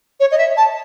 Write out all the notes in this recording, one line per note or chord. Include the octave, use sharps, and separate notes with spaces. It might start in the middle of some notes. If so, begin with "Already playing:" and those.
C#5
D#5
E5
A5